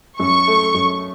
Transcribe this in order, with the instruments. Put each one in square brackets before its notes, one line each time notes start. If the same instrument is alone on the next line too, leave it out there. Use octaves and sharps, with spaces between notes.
[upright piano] F#2 [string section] C#6
[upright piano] A3
F#2